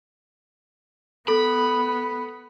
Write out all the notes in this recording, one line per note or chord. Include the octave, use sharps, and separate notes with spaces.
B3 A4 B5